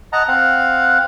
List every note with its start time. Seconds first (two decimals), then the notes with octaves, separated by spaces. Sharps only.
0.13 D#5 F#5 A5 A#5
0.28 C4 F5 F#5